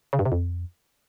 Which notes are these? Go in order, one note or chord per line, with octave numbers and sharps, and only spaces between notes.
C#3
G2
C3
F2